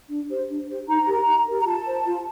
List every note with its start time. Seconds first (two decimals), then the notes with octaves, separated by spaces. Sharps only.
0.09 D4
0.29 G4 C5
0.48 D4
0.67 G4 C5
0.87 D#4 A#5
1.07 G4 A#4
1.27 D#4
1.46 G4 A#4
1.60 A#5
1.65 F4 A5
1.85 C5
2.06 F4